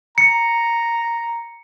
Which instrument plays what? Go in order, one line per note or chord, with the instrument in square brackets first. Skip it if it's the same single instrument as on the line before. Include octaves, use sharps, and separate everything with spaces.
[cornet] A#5 [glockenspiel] C#7